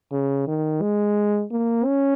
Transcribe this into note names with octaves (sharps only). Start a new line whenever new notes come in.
C#3
D#3
G#3
A#3
C#4